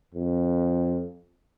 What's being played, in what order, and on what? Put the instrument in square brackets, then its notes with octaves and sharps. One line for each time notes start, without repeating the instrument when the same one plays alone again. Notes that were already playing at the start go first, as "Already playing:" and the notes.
[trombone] F2